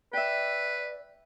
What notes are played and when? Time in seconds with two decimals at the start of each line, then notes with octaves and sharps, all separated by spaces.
0.13 B4 D5 E5 G5